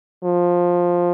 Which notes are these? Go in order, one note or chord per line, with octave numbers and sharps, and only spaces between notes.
F3